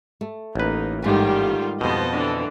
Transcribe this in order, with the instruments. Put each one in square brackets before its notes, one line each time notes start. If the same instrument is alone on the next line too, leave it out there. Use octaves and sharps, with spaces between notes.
[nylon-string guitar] A3
[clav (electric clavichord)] A1 B4 [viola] A#3 D#4
[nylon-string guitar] G#2 G#5 [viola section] D#3 G3 F4 [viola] A3 G4
[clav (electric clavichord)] F2 B2 [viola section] B3 C5 [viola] D#5 A5
[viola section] D3 E3